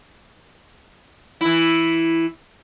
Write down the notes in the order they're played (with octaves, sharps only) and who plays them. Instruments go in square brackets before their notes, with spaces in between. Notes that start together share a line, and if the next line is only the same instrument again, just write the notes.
[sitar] E3 E4